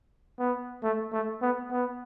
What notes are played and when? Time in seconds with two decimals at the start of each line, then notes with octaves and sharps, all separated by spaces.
0.39 B3
0.83 A3
1.13 A3
1.42 B3
1.71 B3